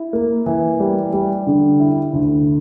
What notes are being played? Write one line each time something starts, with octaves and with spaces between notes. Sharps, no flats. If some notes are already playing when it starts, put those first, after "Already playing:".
Already playing: E4
A#3
E3
G3
G3
D3
E4
D2